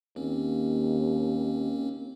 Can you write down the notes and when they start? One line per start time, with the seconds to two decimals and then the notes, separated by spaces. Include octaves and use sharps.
0.16 D#2 A#3 C4 C#4